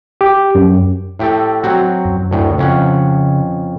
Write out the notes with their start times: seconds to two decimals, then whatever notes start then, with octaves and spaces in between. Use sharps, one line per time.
0.21 G4
0.55 F#2
1.19 A2 G4 A4
1.63 F#3 C4 F#4
2.05 F#2
2.31 D2 A2
2.58 F2 C#3 C#4 F#5